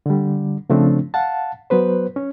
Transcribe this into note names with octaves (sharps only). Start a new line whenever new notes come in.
D3 G3
C#3 F3 A3 C4 D4
F5 F#5 A5
F#3 B3 B4 C5
C#4